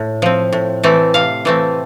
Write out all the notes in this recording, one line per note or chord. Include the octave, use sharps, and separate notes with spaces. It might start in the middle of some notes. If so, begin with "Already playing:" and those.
Already playing: A2
F3 C4
A2
E3 A3 C4
C3 F5
E3 A3 C4